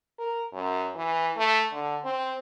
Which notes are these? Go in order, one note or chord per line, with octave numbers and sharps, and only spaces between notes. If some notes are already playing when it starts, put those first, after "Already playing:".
A#4
F#2
E3
A3
D3
C4